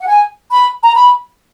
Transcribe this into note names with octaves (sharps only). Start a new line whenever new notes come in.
F#5
G#5
B5
A#5
B5